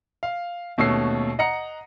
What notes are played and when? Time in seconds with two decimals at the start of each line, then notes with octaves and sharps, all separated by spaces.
0.23 F5
0.78 D#2 B2 A3 C#4 E6 C7
1.39 D#5 F#5 A#5 C#7